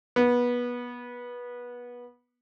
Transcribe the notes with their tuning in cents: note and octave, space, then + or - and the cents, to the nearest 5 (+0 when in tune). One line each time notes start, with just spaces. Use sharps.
B3 -20